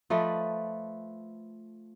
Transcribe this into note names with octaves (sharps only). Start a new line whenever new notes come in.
F3 A3 B4 D#5